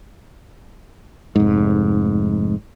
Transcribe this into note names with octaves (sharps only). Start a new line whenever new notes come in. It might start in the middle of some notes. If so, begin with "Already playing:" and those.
F1 G#2